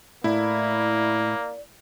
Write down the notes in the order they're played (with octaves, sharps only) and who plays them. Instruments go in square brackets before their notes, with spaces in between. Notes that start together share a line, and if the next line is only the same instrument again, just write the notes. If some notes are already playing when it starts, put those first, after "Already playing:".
[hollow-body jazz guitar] A2 [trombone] A#3 [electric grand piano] E4 [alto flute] D5